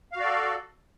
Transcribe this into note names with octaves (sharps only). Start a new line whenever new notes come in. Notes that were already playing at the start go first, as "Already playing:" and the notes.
F#4 A4 D5 F5